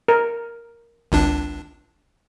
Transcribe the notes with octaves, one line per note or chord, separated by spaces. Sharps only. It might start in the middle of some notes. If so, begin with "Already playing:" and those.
A#4
G#1 C#2 D4